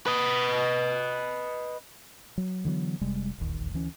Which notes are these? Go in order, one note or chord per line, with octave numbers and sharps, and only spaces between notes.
B4 D#5
F#3
D3 E3 F#3 B3
F1 C3 G3 G#3
E1 A#1 D#2
D2 E3 C#4